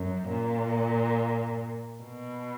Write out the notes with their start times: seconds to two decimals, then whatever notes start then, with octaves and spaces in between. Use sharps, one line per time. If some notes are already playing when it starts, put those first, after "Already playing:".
Already playing: F#2
0.29 A#2
2.02 B2